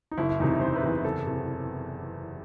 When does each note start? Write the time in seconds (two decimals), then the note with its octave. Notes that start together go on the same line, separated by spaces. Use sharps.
0.11 D#4
0.17 F#1 E4
0.29 E4
0.40 E2 C3 D#4
0.61 F#1 C5
0.76 B4
0.83 E2 C3
1.04 F#1 A4
1.27 C3